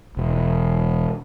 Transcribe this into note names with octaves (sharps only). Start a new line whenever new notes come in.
E1 E2